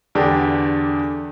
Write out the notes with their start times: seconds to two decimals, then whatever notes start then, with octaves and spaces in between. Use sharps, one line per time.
0.15 E2 D3 D4 G4